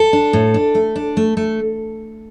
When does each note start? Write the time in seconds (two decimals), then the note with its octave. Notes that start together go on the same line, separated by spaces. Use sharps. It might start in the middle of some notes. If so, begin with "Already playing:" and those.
Already playing: A4
0.13 D4
0.33 A2
0.54 D4
0.75 A3
0.96 D4
1.17 A3
1.37 A3